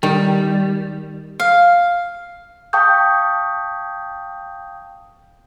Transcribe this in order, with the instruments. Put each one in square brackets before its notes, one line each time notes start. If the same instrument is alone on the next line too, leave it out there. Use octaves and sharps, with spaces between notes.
[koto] D#3 [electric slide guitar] G3
[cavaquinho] F5
[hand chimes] F5 G5 A5 C#6 D#6 G6